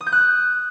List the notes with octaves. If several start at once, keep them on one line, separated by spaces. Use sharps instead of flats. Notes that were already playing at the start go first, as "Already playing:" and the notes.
D#6
G6
F#6